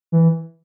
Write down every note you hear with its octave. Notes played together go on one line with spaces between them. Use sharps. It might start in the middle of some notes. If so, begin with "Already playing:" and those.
E3